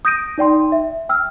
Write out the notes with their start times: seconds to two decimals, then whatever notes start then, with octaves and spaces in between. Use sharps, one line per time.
0.05 D#6 G6 A#6 D7 D#7
0.38 D#4 D5 G5 C6
0.72 E5
1.09 G5 E6 F6